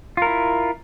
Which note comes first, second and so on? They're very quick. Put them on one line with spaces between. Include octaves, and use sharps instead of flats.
F4 A#4 E4